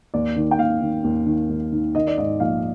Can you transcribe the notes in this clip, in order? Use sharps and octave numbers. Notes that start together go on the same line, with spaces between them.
D#2 D5
D#3
G5
D#2 F5
D#3
D#2
D#3
D#2
D#3
D#3 D#5
D5
G#2 D#5
A#1 F5